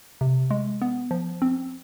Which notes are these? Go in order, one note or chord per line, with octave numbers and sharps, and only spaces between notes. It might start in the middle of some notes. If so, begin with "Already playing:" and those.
C3
G#3
B3
F3
C4